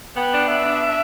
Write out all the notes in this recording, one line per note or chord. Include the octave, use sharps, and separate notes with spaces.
B3 G5
D4
B3 E5
D4
D4